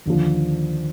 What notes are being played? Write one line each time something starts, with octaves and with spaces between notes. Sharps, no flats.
D#2 D3 F3